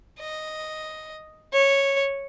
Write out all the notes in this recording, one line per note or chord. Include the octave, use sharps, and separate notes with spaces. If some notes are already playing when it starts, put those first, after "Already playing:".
D#5
C#5